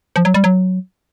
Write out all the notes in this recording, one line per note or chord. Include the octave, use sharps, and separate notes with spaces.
F3
F#3
G3
F#3